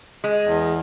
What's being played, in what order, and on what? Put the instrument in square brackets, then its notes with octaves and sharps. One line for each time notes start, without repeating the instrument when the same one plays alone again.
[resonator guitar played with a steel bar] G#3
[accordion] E2